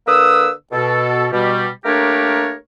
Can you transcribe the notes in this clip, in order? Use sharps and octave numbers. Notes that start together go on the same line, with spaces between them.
D3 A#3 B4 D#6 E6
B2 A4
B2 G3
A3 A#3 D4 G4 A#4 C#5